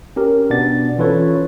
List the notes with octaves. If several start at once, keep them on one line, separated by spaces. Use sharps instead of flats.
C#4 G4 A#4
B2 B3 D4 D5 A6
E3 C#4 F4 A4 B4 C#5